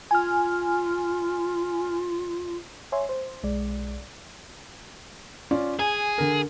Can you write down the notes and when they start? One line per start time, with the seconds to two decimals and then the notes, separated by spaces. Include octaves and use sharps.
0.11 F4 G#5 F6
2.92 C#5 E5 G#5 C6
3.09 C5
3.43 B1 G#3 D5
5.51 C#4 F4 D5
5.79 G#4 G#5
6.18 D3 A#4